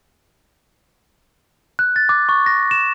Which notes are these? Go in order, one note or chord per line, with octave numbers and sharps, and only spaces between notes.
F#6
A6
D6
C#6
A#6
E7